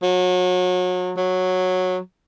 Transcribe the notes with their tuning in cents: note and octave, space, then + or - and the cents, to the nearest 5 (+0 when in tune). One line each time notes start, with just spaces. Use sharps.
F#3 -30
F#3 -10